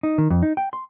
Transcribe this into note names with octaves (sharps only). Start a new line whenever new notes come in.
D#4
D#3
F2
D#4
G5
C6